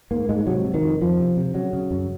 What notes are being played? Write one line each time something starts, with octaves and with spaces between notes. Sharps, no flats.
G#2 A#3
G#2 G#3
G#3
C3 F#3
C3
D#3
F2
F2 F3
C3
C3
C#3 F#3
C#3
F#2